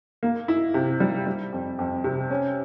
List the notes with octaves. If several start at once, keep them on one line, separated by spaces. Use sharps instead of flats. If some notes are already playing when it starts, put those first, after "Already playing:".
A#3
E4
C3
G3
G3
F2
F2
C3
C#4